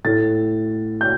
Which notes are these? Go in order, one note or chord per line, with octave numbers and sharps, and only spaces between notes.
A2 A3 E4 A6
G6